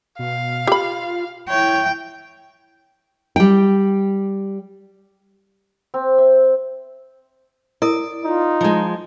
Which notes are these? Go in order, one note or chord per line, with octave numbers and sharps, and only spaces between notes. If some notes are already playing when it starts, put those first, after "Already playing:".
B2 F5
F4 G4 B5
E4 C#5 G5
G3 G5
C4
E5
E4 A#4 D5 D#6
D#4 F4
F3 G#3